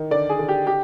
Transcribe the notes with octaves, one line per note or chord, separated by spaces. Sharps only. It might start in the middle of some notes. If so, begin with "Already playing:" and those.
Already playing: D#3
D3 D5
G#4
D3
G4
G4